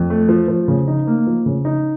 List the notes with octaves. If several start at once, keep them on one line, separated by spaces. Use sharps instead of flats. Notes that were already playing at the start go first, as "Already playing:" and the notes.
Already playing: F2
A3
F3
F3
C#3
D#4
A#3
F3
C#3
D#4